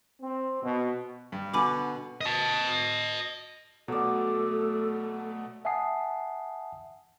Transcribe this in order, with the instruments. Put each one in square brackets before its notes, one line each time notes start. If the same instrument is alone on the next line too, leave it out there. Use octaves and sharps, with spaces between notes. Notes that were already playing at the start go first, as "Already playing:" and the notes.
[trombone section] C4
B2
[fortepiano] G2
[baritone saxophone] B2 [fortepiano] D3 [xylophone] G#5 B5 D6
[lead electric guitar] D#5 A5
[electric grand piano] B2 [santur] F#3 D5 [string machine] A3 [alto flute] A4
[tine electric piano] E5 F#5 G#5 A5 D#6 C7